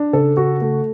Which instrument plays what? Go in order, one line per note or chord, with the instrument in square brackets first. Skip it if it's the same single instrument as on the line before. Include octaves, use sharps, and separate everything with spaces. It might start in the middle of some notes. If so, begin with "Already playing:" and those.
Already playing: [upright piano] D4
[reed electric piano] C#3 [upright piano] A4
[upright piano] F#4
A3